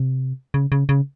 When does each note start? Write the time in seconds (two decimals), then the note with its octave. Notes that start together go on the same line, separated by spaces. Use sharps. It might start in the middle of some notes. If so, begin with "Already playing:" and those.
Already playing: C3
0.54 C#3
0.72 C#3
0.89 C#3